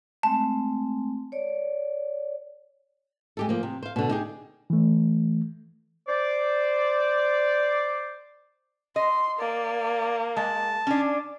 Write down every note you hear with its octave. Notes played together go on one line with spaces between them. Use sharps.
G#3 A3 C4 A5
C#5 D5
G#3 G4 A4
F3 A#3
C3
C5 F5
B2 D3
D#4 G4 G#4
E3 A3
C5 D5
D#5 C6
A#3 D5
G#3 A5
C#4 D4